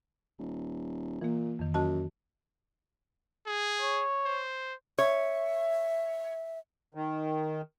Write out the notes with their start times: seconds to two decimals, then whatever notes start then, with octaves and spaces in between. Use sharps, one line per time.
0.39 D#1
1.21 A#2 E3 A#3
1.59 F2 D#3
1.74 F#2 F#4 D#5 A5
3.47 G#4
3.81 C#5
4.25 C5
4.99 C#5 E5
6.95 D#3